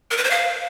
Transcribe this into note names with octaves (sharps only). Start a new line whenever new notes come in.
A#4
B4
C5
F5